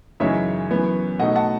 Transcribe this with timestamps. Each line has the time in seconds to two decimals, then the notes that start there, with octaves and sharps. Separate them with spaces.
0.20 F#2 C#3 E3 G#3 D#4 C#5 E5
0.70 F#2 E3 B3
1.19 B2 A3 D#4 D#5 F#5
1.36 F#5 A5